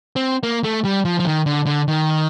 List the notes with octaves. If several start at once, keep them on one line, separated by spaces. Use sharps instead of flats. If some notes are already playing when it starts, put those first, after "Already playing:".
C4
A#3
A3
G3
F3
F3
D#3
D3
D3
D#3